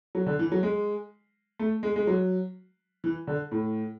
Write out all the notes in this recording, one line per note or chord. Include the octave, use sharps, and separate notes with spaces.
F#3
D3
E3
F#3
G#3
A3
G#3
G#3
F#3
E3
D3
A2